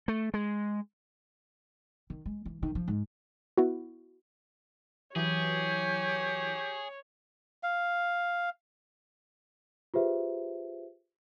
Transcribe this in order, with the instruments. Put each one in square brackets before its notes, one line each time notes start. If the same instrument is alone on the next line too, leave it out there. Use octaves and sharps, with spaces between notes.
[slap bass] A3
G#3
[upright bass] D#3
G#3
E3
D#3
F3
G#2
[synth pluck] B3 E4 F#4
[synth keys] E3 F#3 [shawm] G4 [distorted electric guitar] G#4 [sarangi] C#5
[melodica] F5
[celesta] F4 G4 G#4 B4 C5 E5